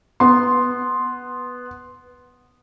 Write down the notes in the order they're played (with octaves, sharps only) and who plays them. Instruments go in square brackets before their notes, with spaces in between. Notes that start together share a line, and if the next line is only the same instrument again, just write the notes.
[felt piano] B3 C6